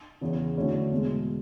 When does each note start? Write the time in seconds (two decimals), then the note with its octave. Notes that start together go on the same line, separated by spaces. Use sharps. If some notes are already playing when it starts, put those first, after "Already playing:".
0.21 E2 C#3 E3
0.56 D3 F#3 A3 C#4 E4
0.91 E2 B2 G#3